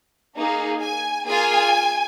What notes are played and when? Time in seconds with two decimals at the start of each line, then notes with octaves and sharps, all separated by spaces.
0.37 A#3 D#4 G#4
0.82 G#5
1.28 A#3 F4 G#4 G#5